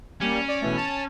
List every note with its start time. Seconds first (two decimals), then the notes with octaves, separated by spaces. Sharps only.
0.21 G3 A#3 C#4
0.48 D5
0.61 B2 E3 A3
0.77 A5